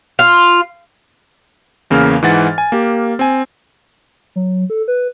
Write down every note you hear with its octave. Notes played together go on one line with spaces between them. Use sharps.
F4
E2 C#3 A#3 F6
G#2 E3 F#5 A6
G#5
A#3 G4
C4 G#5
F#3
A4
B4